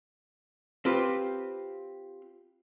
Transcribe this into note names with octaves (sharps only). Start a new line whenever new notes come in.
C4 F4 G4 B4